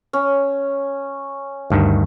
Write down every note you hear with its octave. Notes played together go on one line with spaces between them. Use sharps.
C#4
D2 G2 D#3